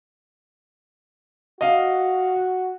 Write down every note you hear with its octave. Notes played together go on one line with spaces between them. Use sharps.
F#4 D#5 F5